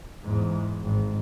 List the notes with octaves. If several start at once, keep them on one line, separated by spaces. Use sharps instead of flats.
E2 G#2
G#1